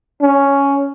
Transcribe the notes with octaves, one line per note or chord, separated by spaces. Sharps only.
C#4